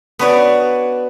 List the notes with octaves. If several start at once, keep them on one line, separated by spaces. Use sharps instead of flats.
B3 D4 F#4 B4 C#5 D5